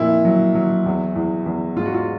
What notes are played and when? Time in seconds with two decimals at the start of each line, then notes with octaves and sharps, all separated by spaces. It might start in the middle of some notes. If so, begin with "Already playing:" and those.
Already playing: F2 A#2 E4
0.25 F#3
0.55 F#3
0.86 E2
1.16 E2
1.46 E2
1.76 G#2 F4
1.85 F#4
1.94 F4